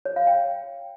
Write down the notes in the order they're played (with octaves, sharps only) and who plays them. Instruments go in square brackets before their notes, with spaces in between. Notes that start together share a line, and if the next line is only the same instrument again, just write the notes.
[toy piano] C#5
F5
G5